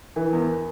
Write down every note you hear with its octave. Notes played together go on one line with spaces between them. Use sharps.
E3 A#4
E2